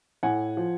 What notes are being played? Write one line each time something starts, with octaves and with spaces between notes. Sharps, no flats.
A2 F#5 G#5
F3